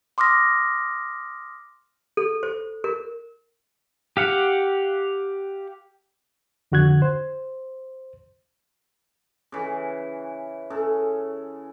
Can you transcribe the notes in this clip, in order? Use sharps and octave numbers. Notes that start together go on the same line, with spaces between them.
C6 D6 D#6 F6 A#6
A4
C5
A#4
G4 F5 F#5
F2 D3 F#4 F#6 G#6
C5
C#3 E3
C#3 A4